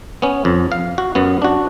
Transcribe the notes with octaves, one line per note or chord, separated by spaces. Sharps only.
B3 C#4
F2
F5
F#4
F#2 B3
D4 F#4